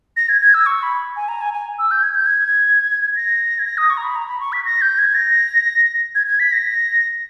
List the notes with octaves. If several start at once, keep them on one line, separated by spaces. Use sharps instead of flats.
A#6
G#6
G#6
E6
C#6
B5
G#5
A#5
G#5
G#5
E6
G6
G#6
G6
G#6
A#6
G#6
A#6
D#6
C#6
A#5
B5
A#5
B5
C#6
B6
A#6
G6
G#6
A#6
G#6
G#6
B6
A#6